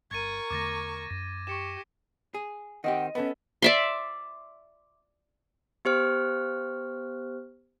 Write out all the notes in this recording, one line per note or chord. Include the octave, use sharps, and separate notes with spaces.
G1 A#4 C#6 G#6 A6 D#7
E2 D3 A3 D6 A6 A#6
F#2 A#6
G4 C#6 C#7 E7
G#4
D#3 C4 G4 D#5 F#5
B3 C#4 A4 B4 D#5
D5 E5 C6
B3 G4 C5 F6